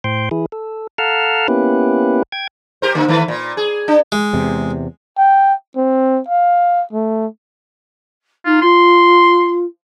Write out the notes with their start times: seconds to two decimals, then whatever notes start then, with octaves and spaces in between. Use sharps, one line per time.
0.04 A2 C5 G5 C6
0.31 E3 E4 G#4
0.52 A4
0.98 A4 F5 F#5 A5 A#5 F6
1.48 A#3 B3 C#4 E4 G4 B4
2.32 G5 G#6
2.82 G4 A#4 C5
2.95 D3 A#3
3.08 D#3 A3 B4
3.28 A#2
3.57 G#4
3.88 D4
4.12 G#3
4.33 E2 C3
5.18 G5
5.77 C4
6.28 F5
6.93 A3
8.46 D#4 F4
8.62 F4 C6